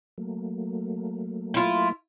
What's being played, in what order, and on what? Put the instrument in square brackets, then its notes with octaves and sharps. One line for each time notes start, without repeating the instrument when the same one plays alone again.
[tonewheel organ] F#3 A3 A#3
[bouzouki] E4 F4